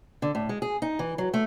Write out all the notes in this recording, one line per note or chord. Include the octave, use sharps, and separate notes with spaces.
D3
A2
G#3
G#4
D#4
E3
F#3
A3